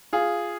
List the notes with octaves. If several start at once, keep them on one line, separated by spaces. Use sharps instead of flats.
F4 G#4